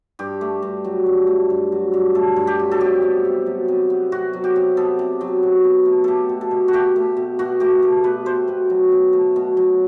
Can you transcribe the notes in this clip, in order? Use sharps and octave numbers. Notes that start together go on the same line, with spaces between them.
G2 G4
A3
G2
F#3
G2
A3
G2
F#3
G2
A3 A4
G2
G4
F#3
A4
C3 G4
B3
C3
F#3
C3
B3
C3 F#4
F#3
G4
C3
B3 A4
C3
F#3
B2
B2
A3
A3 G4 A4
B2
A4
B2
F#4
A3 G4
A3
B2
B2 F#4
A3 G4
A3 A4
B2 B4
A3 C5
B2 B4
F#3
B2
A3
B2
F#3